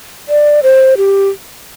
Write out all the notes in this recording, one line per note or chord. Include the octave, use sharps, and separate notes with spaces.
D5
C5
G4